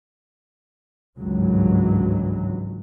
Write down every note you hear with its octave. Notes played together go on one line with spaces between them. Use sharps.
G#1 C#2 G2 E3 F#3